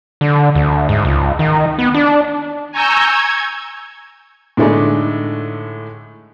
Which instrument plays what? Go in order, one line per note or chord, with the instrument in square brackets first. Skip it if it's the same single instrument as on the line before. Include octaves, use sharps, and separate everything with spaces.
[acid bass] D3
D2
G#2
C#2
D#3
B3
D4
[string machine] G#5 A#5 C#6 E6 G6
G#6
[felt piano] A2 D3 G#3 A3 D4 D#4